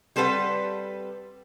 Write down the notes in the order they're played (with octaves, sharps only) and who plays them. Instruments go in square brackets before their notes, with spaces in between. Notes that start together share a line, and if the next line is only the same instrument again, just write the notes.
[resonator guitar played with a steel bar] G3 C4 A4 B4 F#5